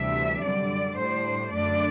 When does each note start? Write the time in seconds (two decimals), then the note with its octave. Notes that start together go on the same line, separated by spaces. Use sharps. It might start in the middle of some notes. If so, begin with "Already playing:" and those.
Already playing: D2 C3 E3 G3 D4 E5
0.43 F#2 D3 G3 D5
0.97 A2 G3 D4 C5
1.52 F#2 D3 A3 D4 D5